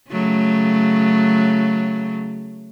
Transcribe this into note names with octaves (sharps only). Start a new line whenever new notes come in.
C#3 F#3 A3